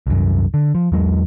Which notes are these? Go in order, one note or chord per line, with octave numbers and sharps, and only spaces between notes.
C2 F#2
D3
F3
E2 F#3 G#3